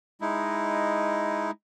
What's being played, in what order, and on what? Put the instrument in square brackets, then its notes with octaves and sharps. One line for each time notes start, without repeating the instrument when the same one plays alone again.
[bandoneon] G#3 D#4 E4